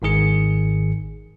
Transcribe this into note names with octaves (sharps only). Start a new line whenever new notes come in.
G#1 G#2 D#3 G#4 C#7